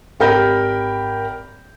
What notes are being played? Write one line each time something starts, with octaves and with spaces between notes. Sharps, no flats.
G#1 G4 A#4 G5 B5 G6